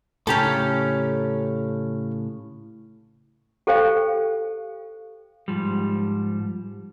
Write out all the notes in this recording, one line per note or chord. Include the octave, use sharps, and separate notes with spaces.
A2 C#3 C#4 G4 A4 A#5
G4 A4 C5 F5 G5
G#2 F3 G3